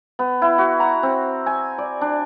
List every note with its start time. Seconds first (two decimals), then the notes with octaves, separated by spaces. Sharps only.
0.19 B3
0.42 E4
0.58 F#4
0.80 A#5
1.03 C4
1.46 G#5
1.78 D5
2.01 D4